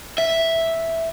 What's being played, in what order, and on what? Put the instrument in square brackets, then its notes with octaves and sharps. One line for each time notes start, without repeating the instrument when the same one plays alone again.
[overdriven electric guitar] E5